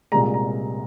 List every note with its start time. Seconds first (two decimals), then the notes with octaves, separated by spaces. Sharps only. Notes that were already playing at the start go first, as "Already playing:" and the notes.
0.12 C2 A#2 G#3 A#5
0.34 A#5